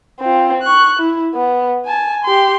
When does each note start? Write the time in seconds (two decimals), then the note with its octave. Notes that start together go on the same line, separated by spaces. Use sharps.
0.20 C4 F4
0.63 C#6 F#6
1.00 E4
1.34 B3
1.86 G#5 A5
2.25 G4 C6